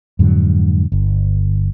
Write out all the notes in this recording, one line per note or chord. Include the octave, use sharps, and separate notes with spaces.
F2 G#2 D3 F#3
G1